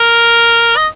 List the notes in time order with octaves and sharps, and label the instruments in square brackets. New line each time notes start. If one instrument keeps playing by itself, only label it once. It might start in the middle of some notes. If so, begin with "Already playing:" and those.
Already playing: [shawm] A#4
D#5